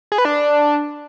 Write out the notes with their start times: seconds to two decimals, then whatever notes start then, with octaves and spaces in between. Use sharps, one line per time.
0.12 G#4
0.18 B4
0.25 D4